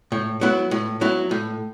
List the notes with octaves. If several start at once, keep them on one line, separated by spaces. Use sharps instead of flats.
A2
F#3 B3 E4
A2
F#3 B3 E4
A2